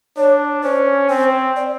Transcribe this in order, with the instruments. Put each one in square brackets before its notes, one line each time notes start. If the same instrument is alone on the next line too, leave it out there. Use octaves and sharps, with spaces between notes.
[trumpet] D4 [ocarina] C#5
[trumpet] C#4 [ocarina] C5
[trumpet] C4 [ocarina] C5
[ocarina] D5